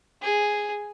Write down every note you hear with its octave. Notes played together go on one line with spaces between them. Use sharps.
G#4